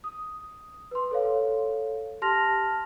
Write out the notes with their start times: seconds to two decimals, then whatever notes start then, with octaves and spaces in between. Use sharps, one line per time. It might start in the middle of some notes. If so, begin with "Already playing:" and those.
0.04 D#6
0.91 B4 C6
1.11 A4 C#5 F5
2.22 G4 A5 C6 F6 A#6 F7